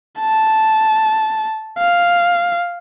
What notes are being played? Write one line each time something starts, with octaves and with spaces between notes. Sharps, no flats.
A5
F5